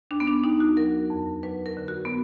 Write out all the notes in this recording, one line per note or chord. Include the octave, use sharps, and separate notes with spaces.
D#2 D4
B3
D4
D#2 D#4
F#4
F#3 A#4
F2
F#3 B4
A#4
D3
F#4
B3